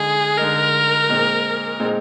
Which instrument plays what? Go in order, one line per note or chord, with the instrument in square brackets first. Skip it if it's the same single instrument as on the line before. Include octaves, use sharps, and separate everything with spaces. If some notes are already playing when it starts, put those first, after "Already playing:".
Already playing: [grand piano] D3 G#3 D#4 [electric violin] G#4
[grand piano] D3 G#3 D#4 [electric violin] A#4
[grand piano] A#2 G#3 C4 D#4
A#2 G#3 C4 D#4